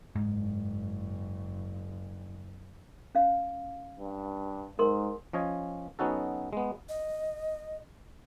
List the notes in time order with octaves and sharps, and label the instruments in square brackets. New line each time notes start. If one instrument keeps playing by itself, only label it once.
[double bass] F#1 [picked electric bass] G#2
[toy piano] C#4 F5
[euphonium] G2
[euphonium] G#2 [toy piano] A#4 C6
[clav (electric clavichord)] F3 C#4 D#5 G#5
F#3 B3 C#4 D#4 F#4 A4
G#3 B3
[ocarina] D#5